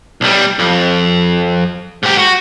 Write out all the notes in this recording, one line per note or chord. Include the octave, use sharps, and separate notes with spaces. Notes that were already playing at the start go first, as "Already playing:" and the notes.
B1 G3
F2
G#2 G4
F#4